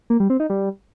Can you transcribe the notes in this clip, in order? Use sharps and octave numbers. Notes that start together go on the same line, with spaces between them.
A#3
G3
C4
D#4
G3